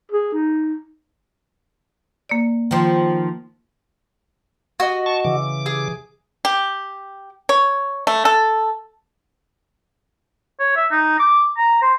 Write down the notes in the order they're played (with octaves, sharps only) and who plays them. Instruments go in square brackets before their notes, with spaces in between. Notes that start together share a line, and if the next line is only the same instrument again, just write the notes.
[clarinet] G#4
D#4
[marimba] A#3 D5
[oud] D#3 F3
[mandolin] F#4 D#5
[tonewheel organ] A5 C#6
C#3 E3 D6
[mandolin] G#4
[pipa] G4
C#5
A3
A4
[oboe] C#5
E5
D#4
D6
A#5
C5